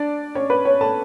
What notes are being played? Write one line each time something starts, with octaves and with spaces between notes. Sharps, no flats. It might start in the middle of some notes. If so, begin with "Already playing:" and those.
Already playing: D4 D5
C#4 C#5
B4
C#4 C#5
A4 A5